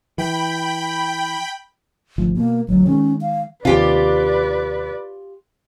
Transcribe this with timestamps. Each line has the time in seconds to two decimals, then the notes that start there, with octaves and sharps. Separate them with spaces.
0.18 E3 G5 B5
2.18 G#1 D2 F3
2.37 B2 A#3
2.69 A1 D2 F#3
2.87 D#3 F#3 G#3 C#4
3.21 F5
3.65 D#2 C3 F4 G4 B4 D5